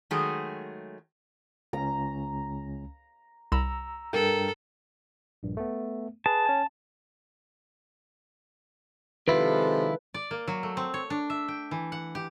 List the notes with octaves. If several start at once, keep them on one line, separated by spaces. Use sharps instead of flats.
D#3 F#3 G#3 A3 G#4
C#2 C#4 A#5
C2 A#5 B5 E6
G2 A4 A#4 G5
A#1 G2
A3 B3
G#4 B4 A5
C#4 G#5
C3 D#3 F3 G#3 E4 F4 A4 B4
D5
A#3
F#3
A3
C4
C#5
D4
E5
G5
E3
F#5
G4